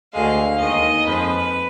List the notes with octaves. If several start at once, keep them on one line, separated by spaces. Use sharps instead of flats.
D2 D3 G#3 F5
D#2 D#3 G#3 D#5
F2 F3 G#3 B4